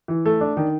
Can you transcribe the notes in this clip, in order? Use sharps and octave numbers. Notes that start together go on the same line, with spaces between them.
E3
A3
D4
D#3